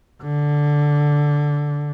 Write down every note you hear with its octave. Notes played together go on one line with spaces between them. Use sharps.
D3